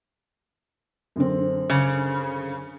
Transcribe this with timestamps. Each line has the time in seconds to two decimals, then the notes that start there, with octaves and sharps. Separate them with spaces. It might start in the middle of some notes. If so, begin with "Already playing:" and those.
1.16 F#2 D3 C4
1.70 C#3